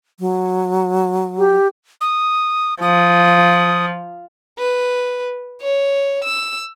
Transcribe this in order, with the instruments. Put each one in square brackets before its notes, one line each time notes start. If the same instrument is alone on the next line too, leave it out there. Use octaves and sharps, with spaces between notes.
[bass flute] F#3
[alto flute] G4
[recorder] D#6
[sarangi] F3 [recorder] D#6
[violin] B4
C#5
E6